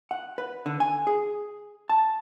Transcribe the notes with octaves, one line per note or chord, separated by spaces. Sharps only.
F#5
B4
D3
G#5
G#4
A5